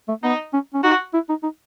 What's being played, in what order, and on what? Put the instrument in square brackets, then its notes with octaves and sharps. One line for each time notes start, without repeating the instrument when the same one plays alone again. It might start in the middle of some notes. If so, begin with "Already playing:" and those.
[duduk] A3
[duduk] B3 [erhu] D#4
[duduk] C#4
C#4
[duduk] D#4 [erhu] F#4
[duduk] E4
D#4
D#4